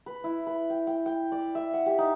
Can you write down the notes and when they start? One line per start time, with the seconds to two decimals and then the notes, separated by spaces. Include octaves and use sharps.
0.06 B4
0.24 E4
0.47 B4
0.70 G5
0.87 G5
1.06 G5
1.32 D5
1.55 E5
1.73 F#5
1.86 G4
1.98 D#4